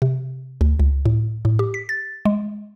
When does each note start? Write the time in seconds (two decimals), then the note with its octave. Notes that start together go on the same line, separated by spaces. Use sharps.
0.02 C3
0.61 D2
0.80 C#2
1.06 A2
1.45 A2
1.59 G4
1.74 B6
1.89 A6
2.25 G#3